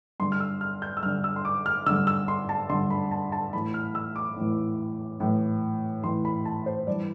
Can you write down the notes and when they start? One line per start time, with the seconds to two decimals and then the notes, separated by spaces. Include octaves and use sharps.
0.20 G2 D3 C6
0.32 F6
0.40 E6
0.61 F6
0.82 G6
0.97 E6
1.03 G2 D3 F6
1.24 E6
1.36 C6
1.45 D6
1.66 F6
1.86 G2 D3 E6
2.07 E6
2.28 C6
2.49 A5
2.70 G2 D3 C6
2.90 B5
3.11 A5
3.32 A5
3.53 A2 E3 B5
3.74 F6
3.95 E6
4.16 D6
4.37 A2 E3
5.20 A2 E3
6.04 A2 E3 C6
6.25 B5
6.45 A5
6.66 C5
6.87 G2 E3 D5